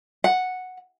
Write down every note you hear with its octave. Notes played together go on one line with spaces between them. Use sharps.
F#5